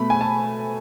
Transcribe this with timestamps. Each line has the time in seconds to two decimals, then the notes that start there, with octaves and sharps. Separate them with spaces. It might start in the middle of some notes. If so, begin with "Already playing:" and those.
Already playing: B2 A3 B5
0.10 G#5
0.21 A5